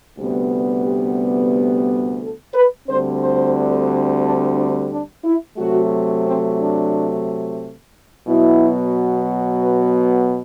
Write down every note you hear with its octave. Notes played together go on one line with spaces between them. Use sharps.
D2 C3 G3 B3
G4
A4
B4
D2 D3 G3 C4 C5
C5
D4
D4
D4
E4
C3 F#3 A3 F#4
C4
D4
B2 F#3 B3 E4
B4